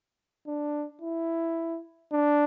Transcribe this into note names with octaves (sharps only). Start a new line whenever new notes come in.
D4
E4
D4